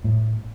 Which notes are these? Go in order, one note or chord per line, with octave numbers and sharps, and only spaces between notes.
A2